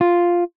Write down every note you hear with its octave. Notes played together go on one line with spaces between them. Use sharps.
F4